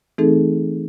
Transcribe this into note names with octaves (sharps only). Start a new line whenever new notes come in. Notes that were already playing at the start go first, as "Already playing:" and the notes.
E3 A3 C4 D#4 G#4 A4